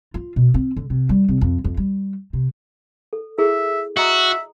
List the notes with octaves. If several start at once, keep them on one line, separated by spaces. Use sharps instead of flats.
F4
B2
C4
D3
C3
G3
C2
F2
F2
G3
C3
A4
E4 G#4 A4 E5
F#4 D#5 E5 A#5 D#6